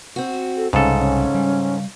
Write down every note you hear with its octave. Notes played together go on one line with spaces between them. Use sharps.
C4 F#4
A4
C2 G#2 C#3 C#4 A4
C#4
G3